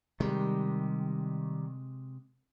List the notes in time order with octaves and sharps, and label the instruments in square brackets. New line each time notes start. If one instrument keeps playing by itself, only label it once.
[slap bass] C3 G#3 [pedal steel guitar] D#3 G3